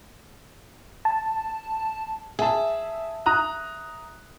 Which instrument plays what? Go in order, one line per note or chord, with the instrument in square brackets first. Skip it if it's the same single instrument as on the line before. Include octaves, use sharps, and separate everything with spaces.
[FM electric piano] A5
[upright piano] G#4 A5 [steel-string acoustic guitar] E5
[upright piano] A#5 D#6 F#6